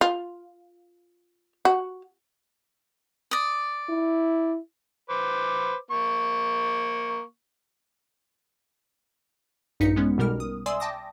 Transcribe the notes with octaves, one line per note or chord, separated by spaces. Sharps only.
F4
F#4
D5 D#6
E4
B4 C5 D6
A#3 C#6
A#1 G2 D#4 B6 C#7
G#3 B3 C#4
B1 B2 G3 A#4 F6
D#6
D5 E5 G#5 C6 D#6 E6
G5 A5 D6 D#6 A#6